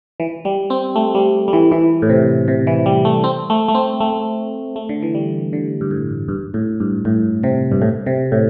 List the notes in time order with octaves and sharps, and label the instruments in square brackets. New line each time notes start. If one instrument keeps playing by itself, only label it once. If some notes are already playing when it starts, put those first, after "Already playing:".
[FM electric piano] E3
G3
C4
A3
G3
G3
E3
E3
A2
C3
C3
E3
G3
A3
C4
A3
A3
C4
A3
A3
D3
E3
G3
D3
G2
A2
G2
A2
G2
A2
C3
G2
A2
C3
A2